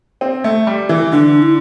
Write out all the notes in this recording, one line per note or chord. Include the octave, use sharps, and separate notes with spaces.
C4
A3
G3
E3
D3 D4
E4